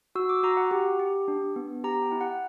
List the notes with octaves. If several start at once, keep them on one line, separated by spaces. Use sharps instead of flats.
F#4 E6
D6
F#4 A#5
F#5
G4
G4
D4
B3
G4 A#5
G5
E4
F#5